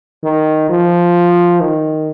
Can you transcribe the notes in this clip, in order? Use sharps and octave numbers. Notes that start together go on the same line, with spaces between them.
D#3
F3
D#3